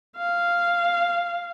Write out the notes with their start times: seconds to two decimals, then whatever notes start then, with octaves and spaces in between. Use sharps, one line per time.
0.17 F5